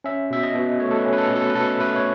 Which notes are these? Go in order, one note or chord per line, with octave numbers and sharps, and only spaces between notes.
C#4 E5
B2 E5
D#5
B2
A3 C#5
A4
B4
C#4
B4
A4
B2
A4
B4
B2 A4
A3 B4
C#5